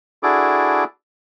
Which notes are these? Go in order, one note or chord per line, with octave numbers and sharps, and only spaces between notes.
D4 E4 F#4 G#4 A4 D6